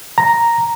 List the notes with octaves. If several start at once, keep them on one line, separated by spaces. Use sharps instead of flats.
A#5